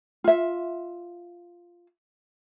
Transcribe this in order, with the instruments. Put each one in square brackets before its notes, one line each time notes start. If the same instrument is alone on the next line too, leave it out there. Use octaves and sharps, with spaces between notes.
[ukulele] F4 E5